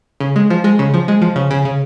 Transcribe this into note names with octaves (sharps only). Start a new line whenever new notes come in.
C#3
G#3
F3
G#3
C#3
F3
G#3
F3
C#3
C#3
C#3